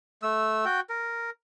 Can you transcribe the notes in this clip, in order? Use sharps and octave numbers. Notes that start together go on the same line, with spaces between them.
A3 E6
F#4 G5
A#4